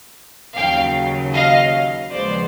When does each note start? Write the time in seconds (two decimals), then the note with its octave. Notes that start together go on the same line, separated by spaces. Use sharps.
0.55 D#2 C#3 F#3 F5 G5
1.33 D#5 F5
2.11 D#2 C#3 F3 G#3 B3 C5 D5